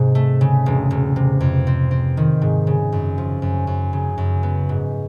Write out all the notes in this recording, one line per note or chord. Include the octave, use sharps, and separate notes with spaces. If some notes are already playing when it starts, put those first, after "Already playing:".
Already playing: G#2 C3
A3
C#3
E1
E1
C3
F2
C4
C4
D#3
G#2
C#3
F#2
F3
F#2
F#2
C#3
F#2
B3
G#2